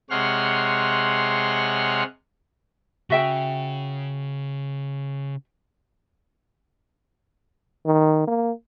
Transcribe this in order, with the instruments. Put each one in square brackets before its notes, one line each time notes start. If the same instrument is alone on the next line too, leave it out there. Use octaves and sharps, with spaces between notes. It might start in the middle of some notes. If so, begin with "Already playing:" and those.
[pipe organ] C3 G#3 C#5 F#5 C6 F6
[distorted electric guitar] C#3 [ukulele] F#4 E5 G5
[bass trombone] D#3
A#3